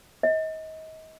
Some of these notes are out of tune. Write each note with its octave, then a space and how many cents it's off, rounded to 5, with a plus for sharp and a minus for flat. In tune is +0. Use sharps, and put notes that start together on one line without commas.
D#5 +30